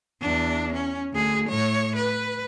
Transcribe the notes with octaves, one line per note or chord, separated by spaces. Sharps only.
E2 D4
C#4
D2 G#4
A2 C#5
B4